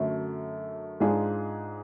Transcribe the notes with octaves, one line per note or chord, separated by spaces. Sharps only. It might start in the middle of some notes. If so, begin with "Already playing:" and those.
Already playing: F#2 D3 F#3 A3
G#2 G#3 D4 F4 G#4